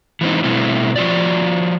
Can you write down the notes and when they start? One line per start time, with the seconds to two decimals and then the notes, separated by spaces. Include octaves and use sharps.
0.21 E3 G#3 C4 D#4
0.44 B2 G3 A3 C4 E4
0.96 F3 F4 F#4 D5